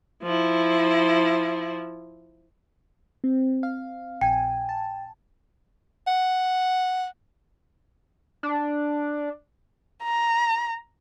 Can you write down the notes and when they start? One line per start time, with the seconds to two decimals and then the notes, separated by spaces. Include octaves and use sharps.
0.24 F3 E4
3.24 C4
3.63 F5
4.21 A#1 G5 G#5
4.69 A5
6.07 F#5
8.43 D4
10.03 A#5